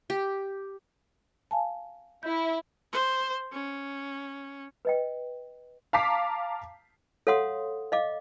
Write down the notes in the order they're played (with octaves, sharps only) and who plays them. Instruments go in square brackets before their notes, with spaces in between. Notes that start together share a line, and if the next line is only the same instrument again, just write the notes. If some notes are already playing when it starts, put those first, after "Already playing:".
[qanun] G4
[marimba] F5 G#5 A5
[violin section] E4 [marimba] G6
[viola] C5
C#4
[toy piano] B4 D#5 G5
[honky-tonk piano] F5 A5 A#5 D6 B6 C7
[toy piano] A4 C#5 F5 F#5 C6 D#6
D#5 F5 D6